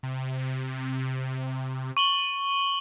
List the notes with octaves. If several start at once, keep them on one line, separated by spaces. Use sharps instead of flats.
C3
C#6 F#7 G7